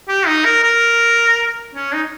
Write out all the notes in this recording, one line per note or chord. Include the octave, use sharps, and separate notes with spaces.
G4
D#4
A#4
A#4
C#4
D#4